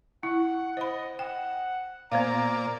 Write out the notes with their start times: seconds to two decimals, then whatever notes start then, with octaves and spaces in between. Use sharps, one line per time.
0.23 E4 F#5
0.77 C5 D#5 B5
1.19 F#5 G5
2.12 A#2 B3 C5 D5 F5 A#5